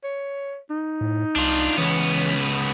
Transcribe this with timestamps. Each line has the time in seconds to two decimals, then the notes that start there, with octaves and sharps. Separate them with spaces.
0.03 C#5
0.70 D#4
1.01 A2
1.36 C2 D4 F4
1.78 C#2 E3 B3 C#4